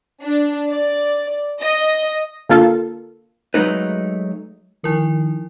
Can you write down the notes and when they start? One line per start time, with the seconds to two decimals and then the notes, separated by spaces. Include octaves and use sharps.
0.22 D4
0.70 D5
1.61 D#5
2.49 D3 A#3 F4 A4
3.54 F#3 G#3 A3 D#4 B4
4.84 D#3 F3 E4 A#4